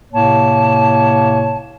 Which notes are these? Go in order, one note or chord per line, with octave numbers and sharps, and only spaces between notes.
A2 C3 A#3 C#5 A5